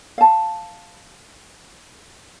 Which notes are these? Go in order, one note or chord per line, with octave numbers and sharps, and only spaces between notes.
F5 A5